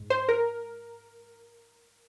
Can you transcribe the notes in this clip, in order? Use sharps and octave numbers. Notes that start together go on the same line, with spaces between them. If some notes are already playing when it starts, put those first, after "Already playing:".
Already playing: G#2
C5
A#4